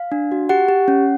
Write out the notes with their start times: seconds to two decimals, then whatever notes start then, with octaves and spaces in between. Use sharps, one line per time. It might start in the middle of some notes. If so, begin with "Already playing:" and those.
Already playing: F5
0.12 D4
0.32 F#4
0.49 G4 F#5
0.69 G4
0.88 C#4